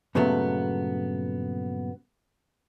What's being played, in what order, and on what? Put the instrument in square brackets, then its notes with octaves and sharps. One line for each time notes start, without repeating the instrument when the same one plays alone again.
[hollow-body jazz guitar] G2 A#2 C#3 F#3 A3 B3